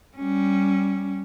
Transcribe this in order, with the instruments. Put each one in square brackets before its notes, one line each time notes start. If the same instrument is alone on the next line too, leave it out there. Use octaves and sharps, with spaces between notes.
[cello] G3 C#4